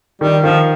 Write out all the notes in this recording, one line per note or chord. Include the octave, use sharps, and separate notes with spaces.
D#3 G3
D#3 F3